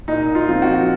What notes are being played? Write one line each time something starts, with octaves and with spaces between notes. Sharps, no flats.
A#2 D#4
F4
F3 C4
F#4